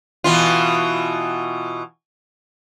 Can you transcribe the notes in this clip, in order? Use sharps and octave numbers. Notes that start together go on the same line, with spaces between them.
B2 E3 F4